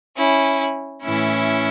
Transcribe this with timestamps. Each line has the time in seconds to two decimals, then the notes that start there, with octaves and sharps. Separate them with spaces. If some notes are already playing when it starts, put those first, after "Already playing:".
0.17 C#4 E4
1.04 A2 E3 C#4 E4